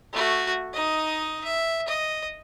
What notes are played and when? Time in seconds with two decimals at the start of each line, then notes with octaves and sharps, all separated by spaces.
0.13 A3 F#4
0.73 D#4 D#5
1.44 E5
1.88 D#5